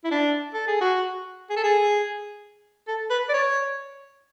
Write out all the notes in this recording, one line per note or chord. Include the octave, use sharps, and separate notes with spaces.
E4
D4
A4
G#4
F#4
G#4
A4
G#4
A4
B4
D5
C#5